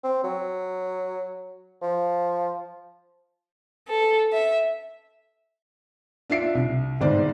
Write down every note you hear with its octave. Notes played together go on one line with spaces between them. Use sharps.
C4
F#3
F3
A4
E5
D4 F4 E5 C7 D7
C2
G1 G#2 C5 D5